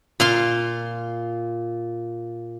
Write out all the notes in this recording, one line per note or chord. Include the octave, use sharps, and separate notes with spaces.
A#2 F5 C6